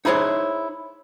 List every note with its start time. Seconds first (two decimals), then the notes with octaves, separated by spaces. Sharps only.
0.05 D#4 E4 G#4 C5 C#5